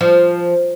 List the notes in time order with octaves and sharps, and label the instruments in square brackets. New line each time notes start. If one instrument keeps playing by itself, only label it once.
[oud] F3